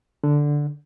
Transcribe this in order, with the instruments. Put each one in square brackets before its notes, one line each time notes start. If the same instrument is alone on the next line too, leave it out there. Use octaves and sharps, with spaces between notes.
[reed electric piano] D3